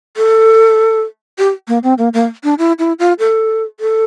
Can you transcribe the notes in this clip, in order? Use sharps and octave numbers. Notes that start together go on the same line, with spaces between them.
A4
G4
A#3
C4
A#3
A#3
D4
E4
E4
F4
A4
A4